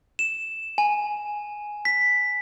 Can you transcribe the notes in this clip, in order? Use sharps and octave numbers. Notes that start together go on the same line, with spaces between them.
E7
G#5
B6